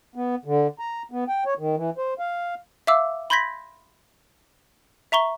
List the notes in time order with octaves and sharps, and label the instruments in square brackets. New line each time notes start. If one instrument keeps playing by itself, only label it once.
[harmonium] B3
D3
A#5
B3
G5
C#5
D#3
E3
C5
F5
[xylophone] E5 F5 D6 E6
B5 C6 G6 G#6 A#6 B6
E5 A#5 C#6 G7